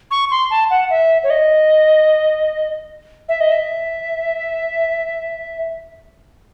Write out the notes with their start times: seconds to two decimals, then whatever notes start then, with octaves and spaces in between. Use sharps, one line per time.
0.11 C#6
0.31 C6
0.51 A5
0.70 F#5
0.90 E5
1.23 C#5
1.30 D#5
3.29 E5
3.40 D#5
3.52 E5